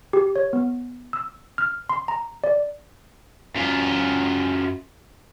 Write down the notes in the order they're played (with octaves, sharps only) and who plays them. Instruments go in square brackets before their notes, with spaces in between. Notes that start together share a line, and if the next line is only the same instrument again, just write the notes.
[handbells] G4
C#5
B3
E6
F6
C6
A#5
D5
[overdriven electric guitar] F#2 F4